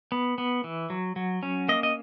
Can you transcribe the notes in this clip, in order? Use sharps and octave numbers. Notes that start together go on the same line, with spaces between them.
B3
B3
E3
F#3
F#3
C#4
A#3 D#5
D#5